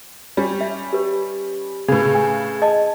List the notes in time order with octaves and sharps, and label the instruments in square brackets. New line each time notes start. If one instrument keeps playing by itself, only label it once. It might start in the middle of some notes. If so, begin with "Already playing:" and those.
[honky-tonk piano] G3 C#4
[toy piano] E5
G4 B4
[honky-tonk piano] A2 C#3 [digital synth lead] G#4 [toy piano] B4 D6
[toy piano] G#5
D#5 A5